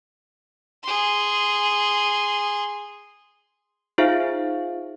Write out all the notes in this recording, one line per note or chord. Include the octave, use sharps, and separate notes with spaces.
G#4 C6
D#4 F4 G#4 C5 E5 F5